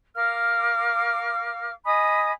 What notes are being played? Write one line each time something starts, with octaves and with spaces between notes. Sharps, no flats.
A#4 F5 D6 F6
D#5 G#5 B5 D#6